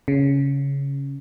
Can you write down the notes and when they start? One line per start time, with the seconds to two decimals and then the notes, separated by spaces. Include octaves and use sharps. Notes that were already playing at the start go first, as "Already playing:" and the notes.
0.08 C#3